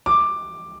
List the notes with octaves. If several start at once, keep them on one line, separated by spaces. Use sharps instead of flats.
D6